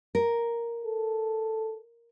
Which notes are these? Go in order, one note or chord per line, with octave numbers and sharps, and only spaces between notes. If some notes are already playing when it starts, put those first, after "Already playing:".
A#4
A4